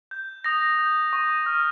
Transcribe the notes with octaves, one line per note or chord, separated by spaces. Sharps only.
G6
D#6 A#6
G6
C#6
F6